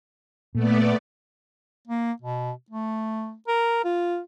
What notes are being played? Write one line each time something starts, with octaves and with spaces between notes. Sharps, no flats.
A#2 A3 B3 D5
A#3
B2
A3
A#4
F4